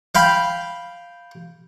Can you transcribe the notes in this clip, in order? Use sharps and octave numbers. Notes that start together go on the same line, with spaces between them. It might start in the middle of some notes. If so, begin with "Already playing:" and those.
F5 G5 B5